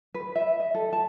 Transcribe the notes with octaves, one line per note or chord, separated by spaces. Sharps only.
B4
E5
D#5
A4
A5